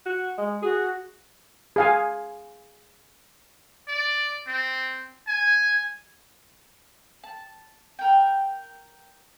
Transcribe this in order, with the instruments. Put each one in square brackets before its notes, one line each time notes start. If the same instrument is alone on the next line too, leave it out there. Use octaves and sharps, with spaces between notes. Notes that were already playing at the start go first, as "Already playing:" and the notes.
[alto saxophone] F#4
G#3
[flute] F#4 [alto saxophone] G#4
[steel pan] G#4 F5 G#5
[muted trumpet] D5
C4
G#5
[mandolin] A5
A#4 G5